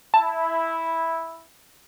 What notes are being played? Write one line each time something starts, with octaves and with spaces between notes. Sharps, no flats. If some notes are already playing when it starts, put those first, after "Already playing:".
E4 A5